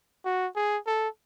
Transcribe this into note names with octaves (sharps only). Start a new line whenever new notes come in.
F#4
G#4
A4